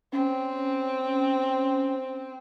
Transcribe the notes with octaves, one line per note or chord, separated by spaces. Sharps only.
C4 C#4